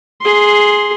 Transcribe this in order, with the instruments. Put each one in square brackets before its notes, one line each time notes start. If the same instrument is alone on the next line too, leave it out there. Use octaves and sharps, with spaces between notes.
[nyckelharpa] G#4 C6